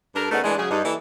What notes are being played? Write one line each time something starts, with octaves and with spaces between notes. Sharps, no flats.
G2 D4 A4 A#4
C#3 A3 B3 D4 D#4 A#4
E3 G#3 A3 D4
C#3 F#3 G#4
G2 D#4
E3 A#3 E4 A4 D5